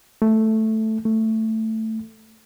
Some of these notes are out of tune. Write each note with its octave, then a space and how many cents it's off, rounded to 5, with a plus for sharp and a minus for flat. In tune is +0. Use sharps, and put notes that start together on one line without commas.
A3 +0
A3 +10